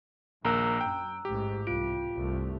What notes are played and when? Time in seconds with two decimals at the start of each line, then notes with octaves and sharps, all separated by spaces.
0.45 A#1 D#2 A#3 A#4 A#5 E6 F#6
0.81 F#2 G5
1.25 A1 G#2 G4
1.67 C2 F4 D7
2.14 C2 G2 A3